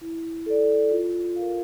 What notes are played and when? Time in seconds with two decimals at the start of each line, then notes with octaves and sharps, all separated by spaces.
0.01 E4
0.46 A4 D5
0.91 F4
1.36 A#4 F5